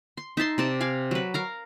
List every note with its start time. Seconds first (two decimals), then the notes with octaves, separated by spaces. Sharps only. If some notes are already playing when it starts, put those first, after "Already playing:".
0.17 C6
0.37 D#4 E5 A5 C6
0.58 C3 D5 A5
0.81 D5 F5 G#5
1.11 F#3 B4
1.34 A#4 F5 A#5